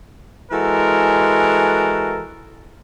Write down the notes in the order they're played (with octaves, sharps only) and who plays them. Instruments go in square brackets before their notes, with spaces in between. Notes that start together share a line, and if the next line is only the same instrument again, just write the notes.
[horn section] E3 G#3 F#4 A4 A#4